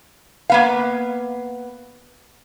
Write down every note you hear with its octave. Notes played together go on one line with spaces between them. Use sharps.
A#3 B3 F5